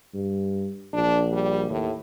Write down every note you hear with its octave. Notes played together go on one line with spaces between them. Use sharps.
G2
A#1 D4
G3
D#2 A2